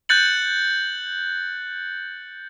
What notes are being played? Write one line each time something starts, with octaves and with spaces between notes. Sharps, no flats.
F#6 G6 A6 C#7 F#7